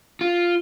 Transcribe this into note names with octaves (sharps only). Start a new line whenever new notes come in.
F4